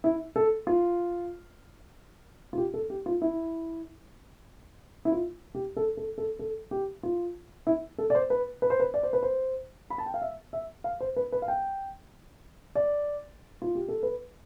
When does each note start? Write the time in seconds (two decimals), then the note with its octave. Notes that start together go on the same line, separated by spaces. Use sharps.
0.04 E4
0.36 A4
0.67 F4
2.53 F4
2.58 G4
2.74 A4
2.90 G4
3.06 F4
3.22 E4
5.05 E4
5.12 F4
5.55 G4
5.77 A4
5.97 A4
6.18 A4
6.39 A4
6.71 G4
7.03 F4
7.67 E4
7.98 A4
8.10 D5
8.15 C5
8.30 B4
8.62 B4
8.70 C5
8.80 B4
8.94 D5
9.03 C5
9.13 B4
9.23 C5
9.90 B5
9.98 A5
10.06 G5
10.14 F5
10.22 E5
10.53 E5
10.84 F5
11.00 C5
11.16 B4
11.32 B4
11.42 F5
11.48 G5
12.75 D5
13.62 F4
13.75 G4
13.88 A4
14.03 B4